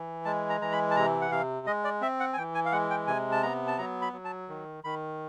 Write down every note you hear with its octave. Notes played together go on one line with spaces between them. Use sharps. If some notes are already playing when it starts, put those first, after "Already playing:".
Already playing: E3
G#3 A5
A#5
E3 A#5
B5
A5
C3 A#5
F#5
C3 F5
G#3 D#5
D5
C4 E5
F#5
G#5
E3 G5
G#5
F5
G#3 F#5
G5
C3 G#5
A5
B3 A#5
A5
F#3 A#5
B5
F#3
A5
D#3
D#3 B5